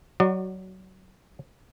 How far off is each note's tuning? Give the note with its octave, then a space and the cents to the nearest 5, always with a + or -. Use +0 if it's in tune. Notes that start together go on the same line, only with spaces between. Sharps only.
F#3 +20 F#4 +0 D5 +35